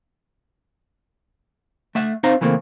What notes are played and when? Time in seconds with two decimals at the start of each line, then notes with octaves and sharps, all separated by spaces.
1.95 A3 E5 F#5
2.23 C4 D#4 C5 F5 A#5
2.41 C#3 E3 A3 A#3 C4